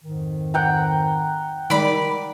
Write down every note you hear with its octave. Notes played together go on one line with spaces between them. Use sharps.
F2 G#2 D#3
F#5 G5 A#5
D#3 G3 G#3 D5 B5